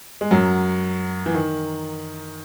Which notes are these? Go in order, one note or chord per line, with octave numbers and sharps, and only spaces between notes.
G#3
F#2 F#3
E3
D#3